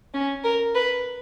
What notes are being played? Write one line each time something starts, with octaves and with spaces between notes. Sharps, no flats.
C#4
A#4
B4